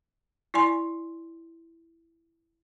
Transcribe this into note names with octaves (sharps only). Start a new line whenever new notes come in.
E4 D5 G#5 C6